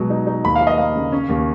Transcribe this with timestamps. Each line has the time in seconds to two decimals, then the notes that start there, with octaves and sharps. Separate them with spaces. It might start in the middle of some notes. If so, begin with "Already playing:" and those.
Already playing: B2 F#3 G#3
0.10 D#4
0.27 D#4
0.44 D#2 B5
0.56 F5
0.61 F3
0.67 D#5
0.78 A#3 F5
0.96 C#3
1.12 C#4
1.29 D#2